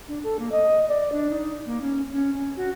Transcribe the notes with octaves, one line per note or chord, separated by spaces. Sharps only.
D4
A4
A#3
D#5
D5
D4
D#4
A#3
C#4
C#4
C#4
F#4